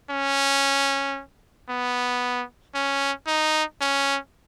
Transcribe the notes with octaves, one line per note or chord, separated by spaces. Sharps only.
C#4
B3
C#4
D#4
C#4